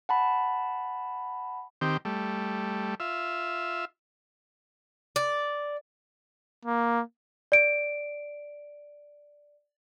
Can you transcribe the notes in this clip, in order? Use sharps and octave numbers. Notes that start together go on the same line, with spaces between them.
F#5 A5 B5
D#3 C4 G4
G3 A3
F4 E5
D5
A#3
D5 D7